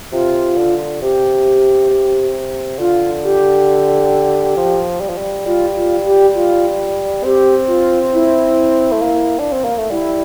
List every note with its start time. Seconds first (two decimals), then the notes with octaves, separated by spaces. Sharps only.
0.12 C3 F4
0.57 D3
1.01 C3 G4
1.90 C3
2.79 D3 F4
3.24 G4
4.57 F3
5.01 G3
5.10 F3
5.18 G3
5.46 G3 F4
5.75 F4
6.06 G4
6.35 F4
7.24 C4 G4
7.68 F4
8.13 E4
8.92 A3
9.01 A#3
9.40 D4
9.52 C4
9.65 A#3
9.78 A3
9.90 G3 E4